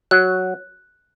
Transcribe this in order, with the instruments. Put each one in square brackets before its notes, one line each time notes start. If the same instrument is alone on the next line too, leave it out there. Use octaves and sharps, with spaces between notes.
[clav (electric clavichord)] F#3 [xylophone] F#6